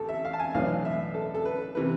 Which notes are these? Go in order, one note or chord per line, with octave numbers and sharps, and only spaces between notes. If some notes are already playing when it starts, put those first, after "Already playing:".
Already playing: A1 A4
E5
F5
A5
G#5
B1 A2 E3 A3 D4 F5
E5
A4
A4
B4
C3 E3 B4